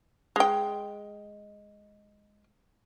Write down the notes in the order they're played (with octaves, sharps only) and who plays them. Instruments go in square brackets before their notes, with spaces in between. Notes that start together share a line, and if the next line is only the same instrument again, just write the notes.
[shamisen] G#3 G5